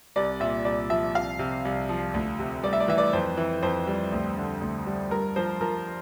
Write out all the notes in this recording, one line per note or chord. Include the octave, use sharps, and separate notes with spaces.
C2 D5
A#2 E5
C2 D5
F3 E5
C2 F5
C3
C2
F3
D2
C3
G3 D5
E5
D5
E3 E5
D5
F2 C5
E3
F2 C5
G3
D2
D3
D2
G3
G2 A#4
F3 C5
F3 A#4